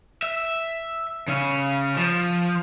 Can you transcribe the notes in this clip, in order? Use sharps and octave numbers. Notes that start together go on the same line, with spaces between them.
E5
C#3 C#4
F3